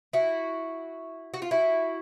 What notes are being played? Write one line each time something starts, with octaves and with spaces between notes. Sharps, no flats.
E4 F#4
F#4
F4
E4 F#4